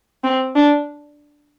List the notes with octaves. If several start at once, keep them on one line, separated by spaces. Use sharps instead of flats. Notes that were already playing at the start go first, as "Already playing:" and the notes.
C4
D4